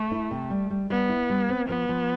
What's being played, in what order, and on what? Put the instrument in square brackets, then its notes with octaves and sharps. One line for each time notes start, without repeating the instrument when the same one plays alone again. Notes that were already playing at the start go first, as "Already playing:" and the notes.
Already playing: [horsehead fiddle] A3
[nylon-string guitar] E4
C3
G3
G3
[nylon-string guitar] G3 [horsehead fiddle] B3
[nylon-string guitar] E4
G3
C4
[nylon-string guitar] F3 [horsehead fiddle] B3
[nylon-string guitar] F3